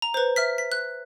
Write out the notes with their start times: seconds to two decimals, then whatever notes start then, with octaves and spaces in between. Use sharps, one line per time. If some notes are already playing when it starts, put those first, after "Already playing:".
0.02 A#5
0.14 B4 C5
0.36 E5 F6 B6
0.58 B6
0.72 F#6